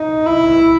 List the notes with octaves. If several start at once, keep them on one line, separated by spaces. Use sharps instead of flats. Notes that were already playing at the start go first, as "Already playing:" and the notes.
Already playing: D#4
E4